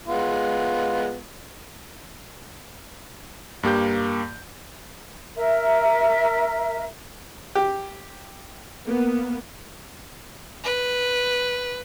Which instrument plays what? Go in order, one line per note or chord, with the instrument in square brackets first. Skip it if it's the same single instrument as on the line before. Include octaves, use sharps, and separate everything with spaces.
[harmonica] G#3 B3 F4
[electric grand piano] G2 A#3 G4 G6
[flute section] A#4 E5
[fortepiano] G4
[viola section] A#3 B3
[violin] B4